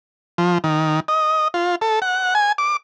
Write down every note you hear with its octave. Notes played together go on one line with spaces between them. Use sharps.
F3
D#3
D#5
F4
A4
F#5
G#5
D6